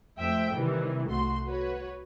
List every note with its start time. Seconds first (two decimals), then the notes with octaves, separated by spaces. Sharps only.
0.19 F2 A3 C5 E5 G5
0.54 C3 D#3 E3 G3
1.10 C2 A3 F#4 C6
1.46 F#4 B4 C#5